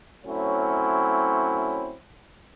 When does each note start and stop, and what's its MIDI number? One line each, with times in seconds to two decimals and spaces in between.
0.25 1.94 54
0.25 1.94 57
0.25 1.94 60
0.25 1.94 61
0.25 1.94 64